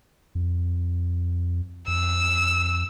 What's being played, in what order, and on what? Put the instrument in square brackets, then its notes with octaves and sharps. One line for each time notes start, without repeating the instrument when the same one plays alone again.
[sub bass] F2
[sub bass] F2 [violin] E6